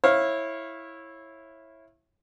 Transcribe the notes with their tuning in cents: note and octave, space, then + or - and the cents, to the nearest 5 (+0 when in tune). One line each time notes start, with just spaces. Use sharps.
E4 +0 C#5 -25 F5 +0